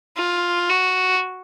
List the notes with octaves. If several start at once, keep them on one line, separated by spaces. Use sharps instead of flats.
F4
F#4